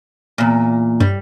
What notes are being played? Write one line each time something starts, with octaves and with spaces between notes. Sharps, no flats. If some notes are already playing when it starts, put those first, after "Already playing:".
E2 A#2
G2 G3